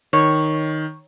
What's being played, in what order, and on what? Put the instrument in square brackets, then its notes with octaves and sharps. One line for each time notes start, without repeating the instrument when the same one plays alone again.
[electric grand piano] D#3 [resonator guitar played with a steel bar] C#5